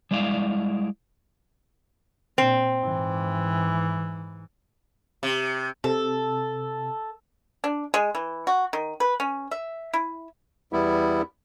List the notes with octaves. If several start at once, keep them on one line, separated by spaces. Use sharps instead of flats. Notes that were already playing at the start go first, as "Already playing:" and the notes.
G3 G#3 E4 D5 F5
A#2 C4
G#2 E3
C3
C3 A4
D4
G#3
E3
F#4
D#3
B4
C#4
E5
E4
E2 G3 B3 E4